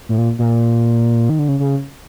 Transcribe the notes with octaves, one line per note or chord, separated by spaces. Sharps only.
A2
A#2
A#2
D#3
D3
C#3
C#3